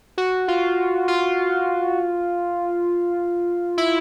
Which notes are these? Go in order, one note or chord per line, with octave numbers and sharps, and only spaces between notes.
F#4
F4
F4
E4